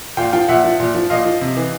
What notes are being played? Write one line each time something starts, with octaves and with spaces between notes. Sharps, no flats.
A#2 F5 G5
F3 F5 G5
A#2 E5 F#5
F3
A#2
F3
A#2 D#5 F5
F3
C3
E3